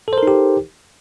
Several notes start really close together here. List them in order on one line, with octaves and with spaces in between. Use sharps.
A4 C5 A#4 D#4 G4